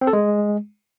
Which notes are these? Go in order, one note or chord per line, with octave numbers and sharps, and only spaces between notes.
C4
A4
G#3